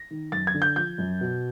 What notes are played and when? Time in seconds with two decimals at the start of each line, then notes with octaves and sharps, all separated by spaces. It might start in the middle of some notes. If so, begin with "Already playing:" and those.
Already playing: A#6
0.11 D#3
0.32 F#2 A6
0.47 G#6
0.54 D3
0.62 G6
0.76 F3 G6
0.98 F#2
1.21 B2